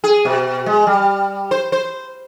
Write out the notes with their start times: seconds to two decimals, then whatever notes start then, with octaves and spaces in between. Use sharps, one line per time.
0.04 G#4
0.25 B2
0.66 G#3
0.87 G3
1.51 C5
1.72 C5